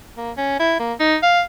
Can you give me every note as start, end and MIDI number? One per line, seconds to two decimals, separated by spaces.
0.17 0.31 58
0.37 0.58 61
0.59 0.75 64
0.79 0.93 58
1.00 1.16 63
1.23 1.42 77